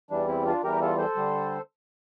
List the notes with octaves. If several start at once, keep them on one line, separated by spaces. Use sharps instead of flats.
E2 E3 G3 D4
C4 E4
D4 F4
E2 E3 G3 G4 A#4
F4 A4
A4 C5
D3 G3